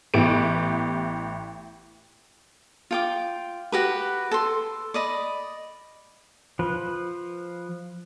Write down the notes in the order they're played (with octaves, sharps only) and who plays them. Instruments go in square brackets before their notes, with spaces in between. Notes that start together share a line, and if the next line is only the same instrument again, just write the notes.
[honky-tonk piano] A1 B3 E4 G4 D7
[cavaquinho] F4 G5 D6
F#4 G4 B4
A4 C6
D5 D#5 B5
[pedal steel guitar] F3 B4